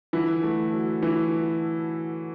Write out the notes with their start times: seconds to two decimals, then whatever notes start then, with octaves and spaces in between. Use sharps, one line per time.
0.13 D3 E3 E4
0.43 A3
0.73 F#3
1.02 E3 E4